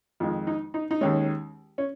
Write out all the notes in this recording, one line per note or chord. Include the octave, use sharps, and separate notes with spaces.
F2 D#3 G#3 F4
D#4
D#4
D#4
D#2 D#3 G#3 C#4
C#4